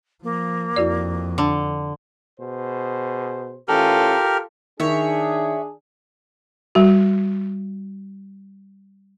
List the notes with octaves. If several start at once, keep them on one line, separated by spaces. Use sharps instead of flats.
F3 A#3
F2 E4 F#4 D5
D3
B2 G#4 C5
A1 E3 C#4 F4 G4 A4 A#4 F6
D#3 D4 G#4 C#5 E5
G3 F#4